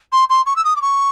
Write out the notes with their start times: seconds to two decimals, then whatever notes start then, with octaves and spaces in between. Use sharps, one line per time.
0.12 C6
0.29 C6
0.46 C#6
0.56 E6
0.64 D#6
0.76 D6
0.82 C#6